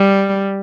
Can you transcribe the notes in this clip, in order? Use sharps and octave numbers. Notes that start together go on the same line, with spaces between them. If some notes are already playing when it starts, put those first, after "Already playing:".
Already playing: G3